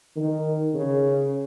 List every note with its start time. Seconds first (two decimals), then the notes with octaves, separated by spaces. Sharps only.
0.16 D#3
0.75 C#3